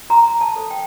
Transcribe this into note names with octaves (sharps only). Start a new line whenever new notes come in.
F#4 A#5
A5
A4 C5
G5